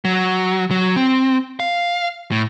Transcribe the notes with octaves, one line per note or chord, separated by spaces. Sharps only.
F#3
F#3
C4
F5
A2